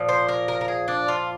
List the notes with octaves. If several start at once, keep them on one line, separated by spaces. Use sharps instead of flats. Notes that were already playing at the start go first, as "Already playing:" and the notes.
Already playing: A#2 F3
C5
A#4
A#4
A#4
G#4
D4
F4